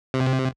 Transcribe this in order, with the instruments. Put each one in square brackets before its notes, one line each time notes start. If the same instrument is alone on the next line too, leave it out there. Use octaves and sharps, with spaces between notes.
[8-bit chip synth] C3